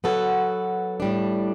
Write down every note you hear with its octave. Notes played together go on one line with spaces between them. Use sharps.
F#3 B3 F#4 A4
A2 G3 D4